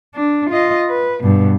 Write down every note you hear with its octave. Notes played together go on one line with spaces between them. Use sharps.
D4
F4 D#5
B4
G2 B2